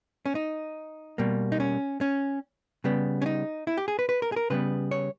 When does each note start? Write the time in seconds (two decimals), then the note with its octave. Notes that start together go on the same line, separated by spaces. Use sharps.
0.26 C#4
0.35 D#4
1.18 B2 G3 A#3
1.52 D#4
1.60 C#4
2.01 C#4
2.84 C#3 G3 B3
3.22 C#4
3.26 D#4
3.67 E4
3.77 G4
3.88 G#4
3.99 B4
4.09 B4
4.22 A#4
4.32 G#4
4.36 A#4
4.50 C#3 G3 B3 B4
4.91 C#5